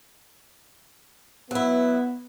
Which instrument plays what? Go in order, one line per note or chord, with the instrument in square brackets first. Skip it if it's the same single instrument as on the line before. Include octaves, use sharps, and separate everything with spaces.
[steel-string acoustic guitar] F#3 E4 [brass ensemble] B3